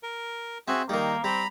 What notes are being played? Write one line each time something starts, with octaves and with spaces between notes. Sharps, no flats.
A#4
C4 F#4 G#4 E5
D#3 G3 A#3 D#4
G3 C4 A#5 B5